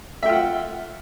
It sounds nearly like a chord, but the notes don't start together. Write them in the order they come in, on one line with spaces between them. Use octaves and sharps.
E5 G5 F4 F#5